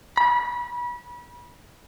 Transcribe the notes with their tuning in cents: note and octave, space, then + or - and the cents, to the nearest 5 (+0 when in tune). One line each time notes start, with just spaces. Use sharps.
B5 -30